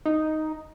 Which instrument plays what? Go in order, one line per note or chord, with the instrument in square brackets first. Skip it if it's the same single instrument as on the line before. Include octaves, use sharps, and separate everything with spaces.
[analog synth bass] D#4